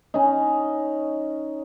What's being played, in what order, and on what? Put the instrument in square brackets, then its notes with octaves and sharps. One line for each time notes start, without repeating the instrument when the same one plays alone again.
[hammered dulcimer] C#4 D#4